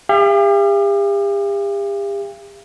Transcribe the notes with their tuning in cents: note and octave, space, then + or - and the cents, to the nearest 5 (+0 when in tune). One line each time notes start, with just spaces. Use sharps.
G4 +40 F5 -45